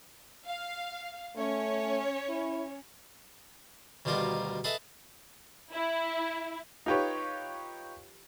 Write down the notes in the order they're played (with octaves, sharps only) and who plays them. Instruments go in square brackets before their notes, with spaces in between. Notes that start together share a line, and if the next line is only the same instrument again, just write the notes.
[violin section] F5
[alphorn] A3 [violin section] C#4 C#5
[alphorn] E4
[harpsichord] D2 B2 D#3 G3 F4 A#4
G#4 A4 B4 D#5 E5 A5
[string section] E4
[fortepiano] D#4 F4 G4 B4 C#5